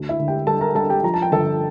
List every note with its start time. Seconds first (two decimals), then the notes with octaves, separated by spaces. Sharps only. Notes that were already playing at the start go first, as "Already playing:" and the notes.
Already playing: D2
0.09 E4 E5
0.19 D3
0.28 G4 G5
0.47 G3 A4 A5
0.61 A#4 A#5
0.75 G3 A4 A5
0.90 G4 G5
1.04 F3 A#5
1.14 A5
1.22 G5
1.32 G1 A4 A5